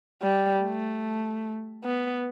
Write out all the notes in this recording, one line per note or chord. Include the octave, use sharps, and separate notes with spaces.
G3
A3
B3